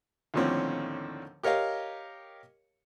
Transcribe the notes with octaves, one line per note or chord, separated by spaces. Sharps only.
D#2 A2 D3 F3 C4 C#4
G4 A#4 C#5 D#5 F5